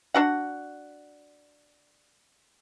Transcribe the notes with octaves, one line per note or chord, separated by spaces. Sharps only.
D4 F#4 F#5